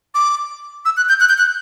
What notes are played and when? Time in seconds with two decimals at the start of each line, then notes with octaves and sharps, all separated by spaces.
0.15 D6
0.85 E6
0.97 F#6
1.09 G6
1.20 F#6
1.29 G6
1.38 F#6